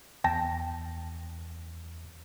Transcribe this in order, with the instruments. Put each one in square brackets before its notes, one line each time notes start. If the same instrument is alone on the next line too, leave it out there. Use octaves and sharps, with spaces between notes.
[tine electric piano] E2 [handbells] G5 A5 A#6